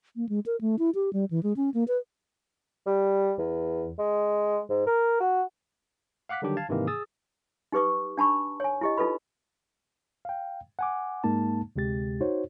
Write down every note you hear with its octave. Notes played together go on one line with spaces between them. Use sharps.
A#3
G#3
A#4
A3
E4
G4
G3
E3
G#3
C#4
A#3
B4
G3
E2
G#3
G#2
A#4
F#4
F5 F#5 D6 F#6 B6
D3 D#3 F#3 G3 D4 G4
F5 A5 G#6 A6
G#2 C3 D#3 E3 A#3 D#4
G#4 D#6 E6 A6
D#4 G4 B4 C#6 D6
D4 A5 B5 C#6
C#5 G#5
E4 G4 D#5
D#4 F4 A4 B4 B5
F5 G5
F#5 G#5 D6
G#2 G#3 A#3 D#4 A5
D2 C3 G#3 G4 A6
D#4 F#4 C5 C#5